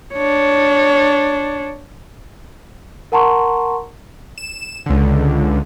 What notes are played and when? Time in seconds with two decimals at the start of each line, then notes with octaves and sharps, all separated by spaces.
0.13 D4 C#5
3.12 A#4 F#5 A5 A#5 C6 C#6
4.38 E7
4.86 C#2 D3